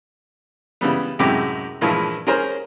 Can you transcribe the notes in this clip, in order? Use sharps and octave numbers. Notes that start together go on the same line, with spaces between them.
C#3 E3 G3 B3
F#2 A2 C3 G#3 G4 D6
G2 A#2 E3 F3 G#3
C#4 G#4 A#4 C5